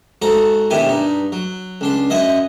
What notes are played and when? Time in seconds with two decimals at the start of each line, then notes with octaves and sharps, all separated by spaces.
0.22 G#2 F#4 A4 A#5
0.70 A#1 B2 D#3 E4 G4 G#5
0.87 G2 D#4
1.32 F#3
1.81 C#2 D4 C6
2.10 F#2 D#5 E5 F#5 G#5